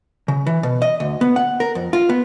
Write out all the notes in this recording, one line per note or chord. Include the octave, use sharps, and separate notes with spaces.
C#3
E3
B2
D#5
D2
B3
F#5
A#4
F2
F4
B3